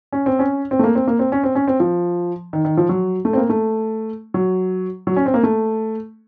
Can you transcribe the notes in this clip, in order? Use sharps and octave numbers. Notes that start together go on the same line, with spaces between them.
C#4
C4
C#4
C4
A3
A#3
C4
A#3
C4
C#4
C4
C#4
C4
F3
D#3
D#3
F3
F#3
A3
C4
A#3
A3
F#3
F#3
C#4
C4
A#3
A3